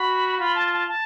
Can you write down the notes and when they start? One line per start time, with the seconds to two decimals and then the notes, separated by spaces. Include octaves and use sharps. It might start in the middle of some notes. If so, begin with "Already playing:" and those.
Already playing: F#4 B5
0.39 F4 B5
0.55 A5
0.73 A5
0.88 A5